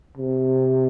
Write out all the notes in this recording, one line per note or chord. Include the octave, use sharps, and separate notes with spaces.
C3